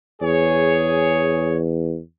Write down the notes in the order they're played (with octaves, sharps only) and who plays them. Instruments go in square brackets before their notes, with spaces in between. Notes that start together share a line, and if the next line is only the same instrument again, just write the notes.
[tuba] E2 [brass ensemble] G#4 C#5